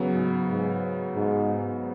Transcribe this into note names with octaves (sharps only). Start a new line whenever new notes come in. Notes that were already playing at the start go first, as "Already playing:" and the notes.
Already playing: C#3 F#3 B3
G#2
G#2
G#2